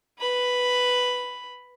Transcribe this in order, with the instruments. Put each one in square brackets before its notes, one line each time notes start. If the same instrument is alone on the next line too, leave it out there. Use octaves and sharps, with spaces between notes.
[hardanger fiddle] B4 B5